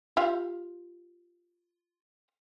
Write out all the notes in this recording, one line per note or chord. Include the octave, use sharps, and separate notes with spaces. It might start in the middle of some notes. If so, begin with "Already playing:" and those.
F4 G4 F5